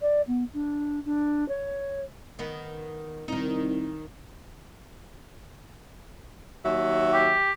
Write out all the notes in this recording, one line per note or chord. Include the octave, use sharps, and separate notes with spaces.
D5
B3
D4
D4
C#5
D#3 B3
C2 D#3 D#4
D#2 F#3 E5
G4